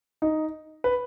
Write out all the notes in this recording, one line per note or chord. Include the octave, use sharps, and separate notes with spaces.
D#4
B4